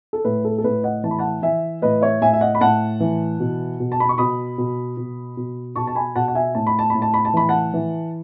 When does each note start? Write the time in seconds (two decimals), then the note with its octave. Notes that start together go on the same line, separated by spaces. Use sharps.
0.13 A4
0.25 A2 B4
0.45 A4
0.58 A4
0.64 A2 B4
0.83 D#5 F#5
1.04 E3 A5
1.11 B5
1.19 F#5 A5
1.42 E3 E5 G#5
1.82 A2 B4 D#5
2.01 C#5 E5
2.22 A2 E5 G#5
2.33 E5
2.41 D#5 F#5
2.55 B5
2.61 A2 F#5 A5
3.00 E3
3.40 B2
3.80 B2
3.92 A5
4.00 B5
4.09 C#6
4.18 B2 B5 D#6
4.58 B2
4.97 B2
5.37 B2
5.76 B2 A5 C#6
5.87 A5
5.95 G#5 B5
6.15 B2 F#5 A5
6.28 F#5
6.35 E5 G#5
6.55 A2 A5
6.67 B5
6.79 A5
6.90 A2 B5
7.02 A5
7.14 B5
7.25 A5
7.34 E3 B5
7.49 F#5 A5
7.74 E3